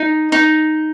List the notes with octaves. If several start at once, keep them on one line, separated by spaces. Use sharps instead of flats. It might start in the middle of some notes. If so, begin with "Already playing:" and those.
Already playing: D#4
D#4